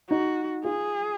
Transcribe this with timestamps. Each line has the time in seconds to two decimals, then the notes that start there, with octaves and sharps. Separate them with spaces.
0.10 D#4 F#4
0.65 F4 G#4